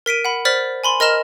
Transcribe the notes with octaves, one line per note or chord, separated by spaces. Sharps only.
A#4 B6 D7 D#7
F#5 B5
C5 D5 F6 A6 B6 F#7
G#5 B5 C6
A#4 D#5 A#5 F6 E7 G7